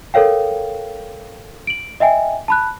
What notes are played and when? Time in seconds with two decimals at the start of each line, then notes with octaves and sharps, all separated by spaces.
0.14 A4 A#4 C#5 F5 G5
1.67 D7 F#7
2.00 D#5 E5 G5 G#5
2.48 A5 B5 F#6